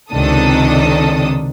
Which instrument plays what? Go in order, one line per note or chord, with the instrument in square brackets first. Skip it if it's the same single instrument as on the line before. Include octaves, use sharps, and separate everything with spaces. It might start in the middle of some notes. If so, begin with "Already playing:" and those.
[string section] C#2 C3 D#3 D4 A4 D#6